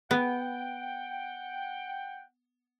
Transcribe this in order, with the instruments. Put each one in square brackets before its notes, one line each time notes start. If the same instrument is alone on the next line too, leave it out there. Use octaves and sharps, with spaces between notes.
[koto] B3 [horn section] F#5 G5